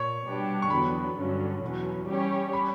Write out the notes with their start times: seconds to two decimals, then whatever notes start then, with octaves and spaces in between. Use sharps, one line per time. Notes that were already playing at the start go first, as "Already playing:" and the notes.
Already playing: A#2 C#5
0.25 B2 G3 B3 D4 G4
0.62 C#6
0.70 E2 D3 F#3 B3 B5
1.16 G2 D3 F#3 C#4
1.62 E2 B2 F#3 C#4
2.07 G3 C#4 G4 C#5
2.53 B5